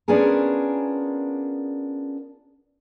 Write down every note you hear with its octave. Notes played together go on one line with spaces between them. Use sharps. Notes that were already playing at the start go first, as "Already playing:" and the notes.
B3 C#4 D4 F4 G#4 A#4